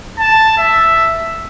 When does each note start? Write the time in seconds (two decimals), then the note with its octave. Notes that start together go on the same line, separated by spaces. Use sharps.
0.19 A5
0.58 E5